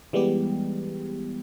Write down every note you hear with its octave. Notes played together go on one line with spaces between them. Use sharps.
E3 G3 G#3 B3 G4